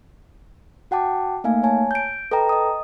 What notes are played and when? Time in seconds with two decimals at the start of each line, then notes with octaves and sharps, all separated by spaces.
0.91 F#4 F#5 G5 A5 D6
1.44 A3 A#3 D#4 F5 G#5
1.63 C#5 G#5 A5
1.91 G6 D7
2.31 A4 B4 D#5 G5 A#5
2.49 D#5 D#6